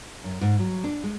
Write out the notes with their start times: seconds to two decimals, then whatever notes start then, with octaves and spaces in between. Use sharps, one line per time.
0.24 F#2
0.41 G#2
0.59 F#3
0.84 D4
1.04 G#3